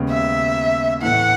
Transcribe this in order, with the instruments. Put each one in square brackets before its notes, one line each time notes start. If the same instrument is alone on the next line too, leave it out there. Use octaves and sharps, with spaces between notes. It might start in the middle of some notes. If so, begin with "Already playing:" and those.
Already playing: [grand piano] D#2 C#3 G#3 B3
[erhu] E5
[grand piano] A2 E3 A3 E4 [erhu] F#5